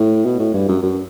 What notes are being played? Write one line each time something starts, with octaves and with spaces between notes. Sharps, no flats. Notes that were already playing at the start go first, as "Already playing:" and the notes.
Already playing: A2
B2
A2
G2
F#2
F#2